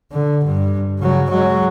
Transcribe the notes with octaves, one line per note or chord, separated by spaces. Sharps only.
D3
G2
C#3 F#3
F#3 G#3